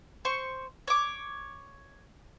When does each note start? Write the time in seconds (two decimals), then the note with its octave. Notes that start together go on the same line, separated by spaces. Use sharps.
0.25 C5 C#6
0.87 C#5 D6